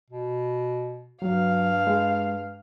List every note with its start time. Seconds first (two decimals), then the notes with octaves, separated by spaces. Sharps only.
0.10 B2
1.22 G2 F#3 F5
1.87 G#3